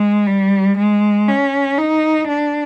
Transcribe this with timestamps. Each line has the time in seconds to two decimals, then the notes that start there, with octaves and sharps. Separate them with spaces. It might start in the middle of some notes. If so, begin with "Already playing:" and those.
Already playing: G#3
0.27 G3
0.77 G#3
1.28 C#4
1.78 D#4
2.28 D4